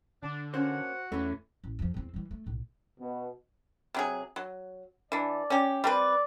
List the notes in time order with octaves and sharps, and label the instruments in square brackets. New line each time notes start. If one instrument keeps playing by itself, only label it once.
[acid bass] D3 [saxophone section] D4
[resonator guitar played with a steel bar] A#3 C#4 [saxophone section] F#4 F#5 [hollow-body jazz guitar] C5
[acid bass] E2 [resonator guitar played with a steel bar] E3 [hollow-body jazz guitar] A3 C#4
[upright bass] A1
F2 F3
E2 C4
E3 G3
A3
B1 A2
[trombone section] B2
[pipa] C3 F#3 G#4
F#3
[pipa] E3 D4 [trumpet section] D5
[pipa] C#4 G4
[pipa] G3 C4 B4 [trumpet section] D5